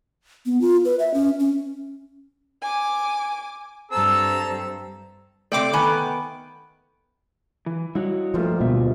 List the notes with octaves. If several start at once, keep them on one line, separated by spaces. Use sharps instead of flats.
B3
F4
B4
E5
C#4
C#4
G#5 D6
G2 C4 A4 A#5 E6
C3 A3 C4 D5 G5 D6
D#3 B3 G#5
E3
G3 E4 F#4 C#5 D#5
G2 A#2 F3 A3 C5
D1 B2 G3 A#3 E5